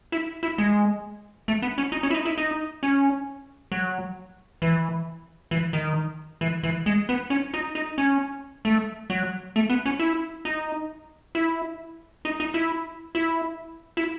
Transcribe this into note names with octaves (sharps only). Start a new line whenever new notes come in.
E4
E4
G#3
A3
B3
C#4
D#4
C#4
E4
D#4
E4
D#4
C#4
F#3
E3
E3
D#3
E3
E3
G#3
B3
C#4
D#4
D#4
C#4
A3
F#3
A3
B3
C#4
E4
D#4
E4
D#4
D#4
E4
E4
E4